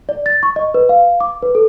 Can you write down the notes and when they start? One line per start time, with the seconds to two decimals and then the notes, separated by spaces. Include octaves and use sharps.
0.09 D5
0.26 A6
0.43 C#6
0.56 D#5
0.74 B4
0.89 F5
1.21 D6
1.43 B4
1.55 A4